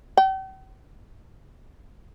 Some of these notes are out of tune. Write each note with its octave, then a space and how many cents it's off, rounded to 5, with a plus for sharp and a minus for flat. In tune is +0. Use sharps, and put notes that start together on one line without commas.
G5 -45